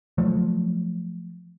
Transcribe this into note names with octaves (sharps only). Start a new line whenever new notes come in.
F3 F#3 A3